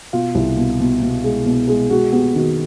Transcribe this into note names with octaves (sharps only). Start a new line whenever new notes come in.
B2 F4
C2
B2
B2
B2
G#3
B2
G#3
G#3 F#4
B3 G4
D#3 F#4